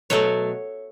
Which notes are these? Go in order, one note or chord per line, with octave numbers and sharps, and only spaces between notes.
B2 F#3 A3 C#5